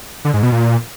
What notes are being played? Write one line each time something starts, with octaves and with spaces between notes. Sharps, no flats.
D3
G#2
B2
A#2